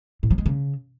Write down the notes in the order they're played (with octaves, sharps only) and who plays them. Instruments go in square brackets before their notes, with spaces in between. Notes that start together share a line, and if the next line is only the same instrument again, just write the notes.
[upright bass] A2
F3
G#3
C#3